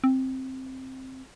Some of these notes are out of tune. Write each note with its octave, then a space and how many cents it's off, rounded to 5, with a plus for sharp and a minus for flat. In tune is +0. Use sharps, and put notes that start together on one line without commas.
C4 +5